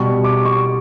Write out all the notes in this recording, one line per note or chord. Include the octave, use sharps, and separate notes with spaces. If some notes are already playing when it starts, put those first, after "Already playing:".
Already playing: B2 G3 B3 C#6
D6
C#6